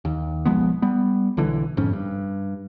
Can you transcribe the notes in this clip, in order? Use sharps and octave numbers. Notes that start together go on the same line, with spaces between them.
D#2
B1 F3 G#3 B3
G3 B3
B1 D3 E3
G1 F2 G#2 C#4
G2